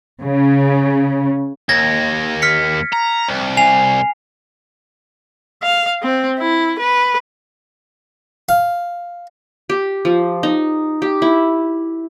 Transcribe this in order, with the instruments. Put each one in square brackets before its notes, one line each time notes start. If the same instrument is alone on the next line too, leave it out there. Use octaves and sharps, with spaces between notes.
[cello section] C#3
[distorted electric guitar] D#2 [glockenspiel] G#6 A#6
[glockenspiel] F6 B6 C#7
[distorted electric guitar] A#5
C2
[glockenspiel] G#5 C7 F7
[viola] F5
C4
E4
B4
[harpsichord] F5
[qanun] G4
F3
D#4
G4
E4